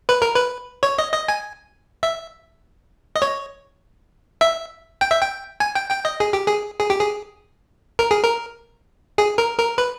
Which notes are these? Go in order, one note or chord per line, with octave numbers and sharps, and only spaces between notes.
B4
A#4
B4
C#5
D#5
D#5
G#5
E5
D#5
C#5
E5
G5
E5
G5
G#5
G5
G5
D#5
G#4
G4
G#4
G#4
G4
G#4
A#4
G#4
A#4
G#4
A#4
A#4
B4